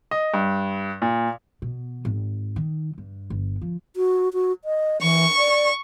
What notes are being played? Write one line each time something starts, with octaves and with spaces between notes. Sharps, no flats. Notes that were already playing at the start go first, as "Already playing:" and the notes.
D#5
G2
A#2
B2
G#1
D#3
G2
G1
F3
F#4
F#4
D#5
E3 C#6
D5